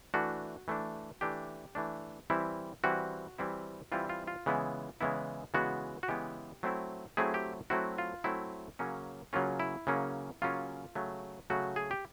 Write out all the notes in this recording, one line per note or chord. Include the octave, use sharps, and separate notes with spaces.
E3 A3 D4 F#4
E3 A3 D4
E3 A3 D4 G4
E3 A3 D4
E3 G3 C4 E4
E3 G3 C4 E4 F#4
E3 G3 C4 E4
E3 G3 C4 E4 F4
F4
F4
C#3 E3 G#3 B3 E4
C#3 E3 G#3 B3 E4
C#3 E3 G#3 B3 E4 F#4
F#4
C#3 E3 G#3 B3 E4 G4
F#3 A3 C4 E4
F#3 A3 C4 E4 G#4
G4
F#3 A3 C4 E4 F#4
F4
F#3 A3 C4 E4
C#3 F#3 A#3 C#4
C#3 F#3 A#3 C#4 F4
E4
C#3 F#3 A#3 C#4
C#3 F#3 A#3 C#4 F4
C#3 F#3 A3
C#3 F#3 A3 F#4
G#4
G4